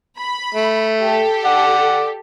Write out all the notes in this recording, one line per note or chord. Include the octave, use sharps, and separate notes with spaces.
B5
A3
G4 A4
D5 F#5